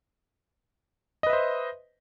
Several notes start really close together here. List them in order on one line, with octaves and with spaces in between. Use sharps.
D#5 B4 E5 C5